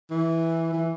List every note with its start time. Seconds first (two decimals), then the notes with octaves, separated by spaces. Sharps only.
0.11 E3
0.73 E3